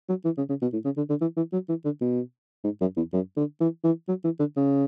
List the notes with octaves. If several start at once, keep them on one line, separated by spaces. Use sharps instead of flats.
F#3
E3
C#3
C#3
B2
A2
C#3
D3
D3
E3
E3
F#3
E3
D3
B2
G#2
F#2
E2
F#2
D3
E3
E3
F#3
E3
D3
C#3